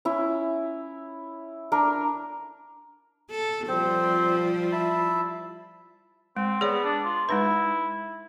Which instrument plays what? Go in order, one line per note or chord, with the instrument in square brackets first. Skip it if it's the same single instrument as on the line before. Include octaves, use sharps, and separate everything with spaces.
[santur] C#4 E4
D4 A#4
[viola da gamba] A4
[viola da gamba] F3 G3 [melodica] C4 C5
[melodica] E4 E5 A5
[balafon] G#3 [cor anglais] C4
[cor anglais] B3 [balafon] G#4 C#5 D5
[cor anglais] D4
F4
[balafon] G#3 D#4 B4 [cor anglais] E4